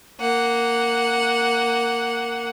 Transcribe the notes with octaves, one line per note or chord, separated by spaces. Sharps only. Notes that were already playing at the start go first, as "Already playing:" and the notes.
A#3 F#5